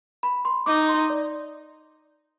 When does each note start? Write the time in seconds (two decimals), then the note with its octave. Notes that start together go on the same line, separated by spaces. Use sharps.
0.23 B5
0.45 C6
0.66 D#4 D6
0.89 C6
1.10 D5